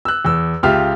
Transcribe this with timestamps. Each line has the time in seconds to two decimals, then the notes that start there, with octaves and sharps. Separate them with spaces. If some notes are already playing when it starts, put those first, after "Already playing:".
0.05 E6 F#6
0.25 E2 E6
0.63 C#2 F4 G4 E5 F6